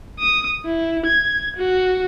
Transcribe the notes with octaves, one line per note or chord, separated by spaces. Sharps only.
D#6
E4
G#6
F#4